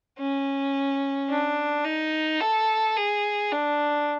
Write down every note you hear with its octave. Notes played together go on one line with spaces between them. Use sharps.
C#4
D4
D#4
A4
G#4
D4